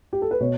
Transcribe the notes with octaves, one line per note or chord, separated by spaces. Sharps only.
G4
A4
B4
B2 C#5